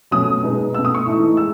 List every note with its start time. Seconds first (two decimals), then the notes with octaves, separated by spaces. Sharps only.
0.11 B2 F#3 A3 C#4 D#6
0.43 B2 G#3 B3 D#4
0.74 B2 A3 D#4 E6
0.85 D#6
0.95 C#6
1.06 A2 E3 A3 D#4
1.37 G#3 E6